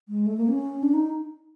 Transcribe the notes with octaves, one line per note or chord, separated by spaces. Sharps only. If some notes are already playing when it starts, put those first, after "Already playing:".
G#3
A3
A#3
C#4
D4
D#4